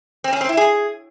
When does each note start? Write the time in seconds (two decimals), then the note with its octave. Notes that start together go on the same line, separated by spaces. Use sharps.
0.24 C4
0.33 C#4
0.41 C4
0.49 E4
0.57 G#4